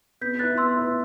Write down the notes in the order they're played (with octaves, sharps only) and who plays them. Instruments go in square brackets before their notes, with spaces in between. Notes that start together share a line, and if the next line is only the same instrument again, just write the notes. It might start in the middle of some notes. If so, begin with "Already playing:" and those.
[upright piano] B3 [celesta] G6 B6
[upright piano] E4 B4 [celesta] F#6 A6
[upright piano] B3 [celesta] C6 E6
[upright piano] E4 B4